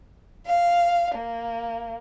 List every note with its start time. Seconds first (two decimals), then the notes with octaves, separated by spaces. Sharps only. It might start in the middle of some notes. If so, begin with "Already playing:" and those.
0.46 F5
1.15 A#3